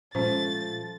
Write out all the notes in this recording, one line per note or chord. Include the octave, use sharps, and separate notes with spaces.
A#2 F3 G#3 A3 C#4 C5 A6